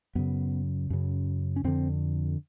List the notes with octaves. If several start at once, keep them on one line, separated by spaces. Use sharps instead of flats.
F#2 C#3 B3
F#2 C#3
C#4
F2 D3 C4